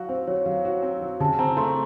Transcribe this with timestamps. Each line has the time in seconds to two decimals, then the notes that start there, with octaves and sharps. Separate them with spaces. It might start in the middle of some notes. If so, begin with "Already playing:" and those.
Already playing: F#3 F#4 F5
0.09 C4 C5
0.27 F#3 C#5
0.46 F#3 F5
0.65 F#4
0.83 C4
1.02 F#3
1.20 C#3 A5
1.39 C4 A#5
1.57 A3 C6